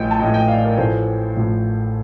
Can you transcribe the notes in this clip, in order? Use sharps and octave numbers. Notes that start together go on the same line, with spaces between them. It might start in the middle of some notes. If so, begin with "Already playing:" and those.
Already playing: A1 A2 F3 D#5 G5
A5
A1 A2 F3 D#5 G5
D#5 G5
D5 F5
A#4 D5
A1 A2 F3 A4 C5
A1 A2 F3